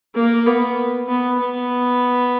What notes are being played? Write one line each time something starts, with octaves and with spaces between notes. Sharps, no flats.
A#3
B3
B3
B3